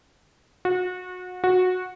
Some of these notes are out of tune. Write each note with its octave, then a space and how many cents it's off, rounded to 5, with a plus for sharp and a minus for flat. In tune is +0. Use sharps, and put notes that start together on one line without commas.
F#4 -30
F#4 -15